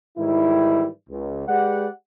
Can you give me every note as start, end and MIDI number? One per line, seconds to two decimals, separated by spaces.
0.17 0.86 44
0.17 0.86 51
0.17 0.86 52
0.17 0.86 55
0.17 0.86 64
1.09 1.47 37
1.47 1.86 56
1.47 1.86 67
1.47 1.86 71
1.47 1.86 74
1.47 1.86 78